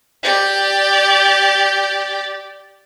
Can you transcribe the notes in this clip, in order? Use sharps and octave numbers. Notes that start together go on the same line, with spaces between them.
G4 D5